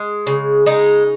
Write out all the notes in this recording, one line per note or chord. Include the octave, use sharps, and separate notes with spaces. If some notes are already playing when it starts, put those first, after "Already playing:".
Already playing: G#3
C#3
G#3 D#4